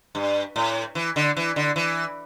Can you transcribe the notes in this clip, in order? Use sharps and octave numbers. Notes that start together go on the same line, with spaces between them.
G2
A2
E3
D3
E3
D3
E3